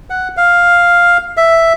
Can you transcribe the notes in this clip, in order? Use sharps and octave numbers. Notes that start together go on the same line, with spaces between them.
F#5
F5
E5